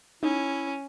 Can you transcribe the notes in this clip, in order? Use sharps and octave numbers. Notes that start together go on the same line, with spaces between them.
C#4 D#4 E4